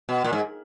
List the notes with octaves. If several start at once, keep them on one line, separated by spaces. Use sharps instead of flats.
B2
A#2
G#2